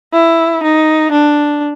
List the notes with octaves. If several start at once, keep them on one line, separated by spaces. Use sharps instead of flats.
E4
D#4
D4